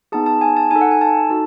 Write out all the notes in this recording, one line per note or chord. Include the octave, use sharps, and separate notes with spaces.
B3 D#4 G#4 A5
A5
G#5
A5
D#4 A4 G#5
F#5
G#5
A5
D#4 F#4 A4